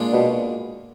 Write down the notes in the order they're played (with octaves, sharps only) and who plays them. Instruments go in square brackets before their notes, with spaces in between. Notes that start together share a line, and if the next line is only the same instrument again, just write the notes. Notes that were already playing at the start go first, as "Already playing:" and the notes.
Already playing: [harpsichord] A#2 G#3 D4 F4
[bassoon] B2